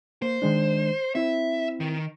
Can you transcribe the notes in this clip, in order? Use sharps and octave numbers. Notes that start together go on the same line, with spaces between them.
A#3 C5
D#3 G#3 D4
C4 E4 E5
D#3